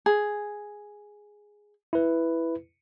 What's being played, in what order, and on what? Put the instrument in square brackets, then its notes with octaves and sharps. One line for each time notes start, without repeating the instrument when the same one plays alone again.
[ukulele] G#4
[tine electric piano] E4 B4